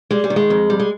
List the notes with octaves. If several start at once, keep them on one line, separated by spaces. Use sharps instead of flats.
G3 G#3
G3
D#3
G#3
F2
G3
G#3